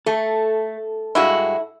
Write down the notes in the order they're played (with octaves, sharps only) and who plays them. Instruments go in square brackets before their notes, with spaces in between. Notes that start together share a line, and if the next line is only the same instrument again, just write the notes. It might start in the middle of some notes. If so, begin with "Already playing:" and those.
[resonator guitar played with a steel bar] A3 [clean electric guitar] A4
[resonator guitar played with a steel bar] G2 G#3 F#4 [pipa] E4